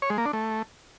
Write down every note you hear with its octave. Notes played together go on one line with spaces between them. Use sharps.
C#5
G#3
A#3
D4
A3